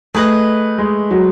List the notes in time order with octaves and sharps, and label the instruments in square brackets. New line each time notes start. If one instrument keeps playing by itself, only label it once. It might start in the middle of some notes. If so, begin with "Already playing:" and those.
[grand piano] A3 [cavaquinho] G#4 B4 D#5
[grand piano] G#3
F#3